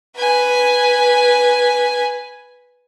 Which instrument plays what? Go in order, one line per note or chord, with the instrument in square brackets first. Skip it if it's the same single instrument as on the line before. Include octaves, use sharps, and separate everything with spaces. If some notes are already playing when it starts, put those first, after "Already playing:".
[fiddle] B4 G#5